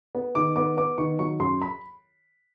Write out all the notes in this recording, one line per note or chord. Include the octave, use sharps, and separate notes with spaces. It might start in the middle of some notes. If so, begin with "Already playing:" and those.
B3
D#3 D6
B3 D6
B3 D6
D#3 C#6
F#3 C#6
F#2 C6
B5